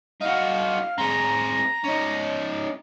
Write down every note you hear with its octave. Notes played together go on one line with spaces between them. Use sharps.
D#4 F#4 F5
C4 G#4 A#5
C#4 D#4